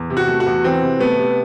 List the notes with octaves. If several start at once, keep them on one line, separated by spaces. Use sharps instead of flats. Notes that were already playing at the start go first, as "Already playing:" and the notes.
Already playing: E2
C3
F#4
A3
F#4
E2
E3 C4
C3
A3 B3
C3